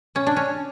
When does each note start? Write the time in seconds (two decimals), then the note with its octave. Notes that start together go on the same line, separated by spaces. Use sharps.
0.15 B2 C#4
0.26 D4
0.36 C#4